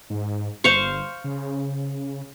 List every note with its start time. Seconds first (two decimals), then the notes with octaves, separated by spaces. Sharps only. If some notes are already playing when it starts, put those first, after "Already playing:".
0.10 G#2
0.64 G1 C5 F5 C#6
1.24 C#3